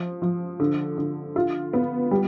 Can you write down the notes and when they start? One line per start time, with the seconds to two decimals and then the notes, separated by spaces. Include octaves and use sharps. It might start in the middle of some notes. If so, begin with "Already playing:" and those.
Already playing: F3
0.22 F3
0.60 D3
0.98 D3
1.36 F4
1.73 B3
2.11 G3